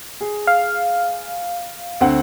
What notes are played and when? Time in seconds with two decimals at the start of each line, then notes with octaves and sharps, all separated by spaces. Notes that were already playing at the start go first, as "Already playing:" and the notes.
0.21 G#4
0.47 F5
2.01 D2 C4 F#5